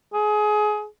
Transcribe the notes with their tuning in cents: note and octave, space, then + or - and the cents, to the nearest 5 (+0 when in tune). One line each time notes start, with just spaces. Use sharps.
G#4 +25